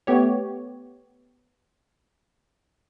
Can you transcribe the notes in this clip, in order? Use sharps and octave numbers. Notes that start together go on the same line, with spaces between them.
A3 B3 G4 C#5